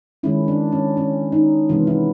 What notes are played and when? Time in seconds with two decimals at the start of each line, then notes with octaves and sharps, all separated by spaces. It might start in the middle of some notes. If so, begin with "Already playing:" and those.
0.23 D#3 G#3 C#4 E4
0.48 D4
0.72 C#4
0.97 C#4
1.32 D#4
1.69 C3 E3 G#3 B3 F4
1.87 E4